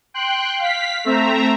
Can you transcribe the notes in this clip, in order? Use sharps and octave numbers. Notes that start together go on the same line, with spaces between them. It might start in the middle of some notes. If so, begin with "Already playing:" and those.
G5 C6 F#6
F5 B6
A3 C4 E5 A#5